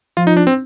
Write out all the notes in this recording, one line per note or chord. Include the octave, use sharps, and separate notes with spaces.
F3 F4
D#4
D4
C4